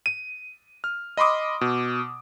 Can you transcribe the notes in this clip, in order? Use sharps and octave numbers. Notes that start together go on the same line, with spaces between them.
D#7
F6
D#5 B5 C6 D6 D#6
B2